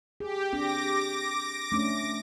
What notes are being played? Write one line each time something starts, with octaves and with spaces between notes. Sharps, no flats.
G4 G#4
C4 D4 G4 D6 A#6
A3 C#4 D4